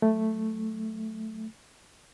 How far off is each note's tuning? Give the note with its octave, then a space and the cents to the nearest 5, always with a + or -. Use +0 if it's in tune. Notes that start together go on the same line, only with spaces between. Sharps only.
F#3 +5 A3 +0